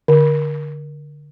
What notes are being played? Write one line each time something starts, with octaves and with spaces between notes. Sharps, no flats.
D3